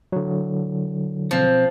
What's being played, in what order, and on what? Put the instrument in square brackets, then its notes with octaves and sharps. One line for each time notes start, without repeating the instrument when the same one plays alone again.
[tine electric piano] D3 F#3
[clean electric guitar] B1 C4 [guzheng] F3